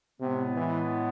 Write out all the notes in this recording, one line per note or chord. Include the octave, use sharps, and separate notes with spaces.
A2 C3 G#3 B3
E3